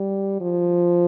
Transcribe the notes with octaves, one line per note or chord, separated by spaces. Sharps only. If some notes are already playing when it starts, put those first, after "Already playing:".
Already playing: G3
F3